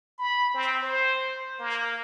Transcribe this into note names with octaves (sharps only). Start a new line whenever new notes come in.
B5
C4
C5
A#3